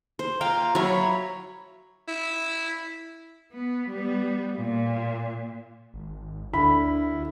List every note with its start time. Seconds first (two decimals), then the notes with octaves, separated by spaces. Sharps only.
0.19 C5
0.41 F4 F5 G5 A#5
0.75 F#3 C#5 E5 A#5 B5
2.08 E4
3.53 B3
3.89 G3 B3
4.57 A#2
5.94 G#1
6.54 D2 D3 E4 B5